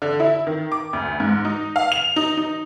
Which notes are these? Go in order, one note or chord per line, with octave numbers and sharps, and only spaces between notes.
D3
E4
D#3
D6
D2
G#2
D#4
F5
F7
D#4
D#4